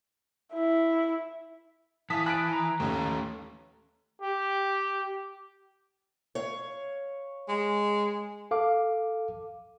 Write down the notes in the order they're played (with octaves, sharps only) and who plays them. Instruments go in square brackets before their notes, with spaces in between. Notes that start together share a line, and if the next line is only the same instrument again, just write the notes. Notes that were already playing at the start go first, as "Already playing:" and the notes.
[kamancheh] E4
[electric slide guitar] E3 [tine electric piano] F5 G#5 A5 [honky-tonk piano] D#6 B6
[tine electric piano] G#5 A5 B5 [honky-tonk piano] F#6 B6 D7
[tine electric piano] A#5
[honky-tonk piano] D#2 [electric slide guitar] A3 C#4
[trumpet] G4
[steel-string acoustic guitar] C#5 F5
[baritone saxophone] G#3
[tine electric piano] A4 F5 D6